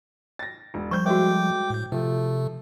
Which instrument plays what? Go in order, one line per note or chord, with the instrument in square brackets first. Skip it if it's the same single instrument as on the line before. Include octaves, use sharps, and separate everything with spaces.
[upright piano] A6 A#6
E1
[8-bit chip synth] F3 G3 [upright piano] C5 G6 [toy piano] C#6
[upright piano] G#3 A3 [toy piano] F#4 C5 [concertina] G5 D6
[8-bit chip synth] A2 G6
[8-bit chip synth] C3 [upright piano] F3 [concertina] A3